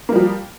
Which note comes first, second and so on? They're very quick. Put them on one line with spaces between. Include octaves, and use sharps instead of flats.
A#3 G3 F3